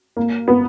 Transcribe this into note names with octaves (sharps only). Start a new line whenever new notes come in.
A#3
B3